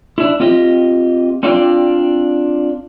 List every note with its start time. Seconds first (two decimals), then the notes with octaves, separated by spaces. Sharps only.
0.18 D4 E4
0.40 C4 F4 G4 D#5
1.43 C4 D4 F4 D5 F5 G5